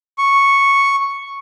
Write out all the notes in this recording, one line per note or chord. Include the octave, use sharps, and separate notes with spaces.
C#6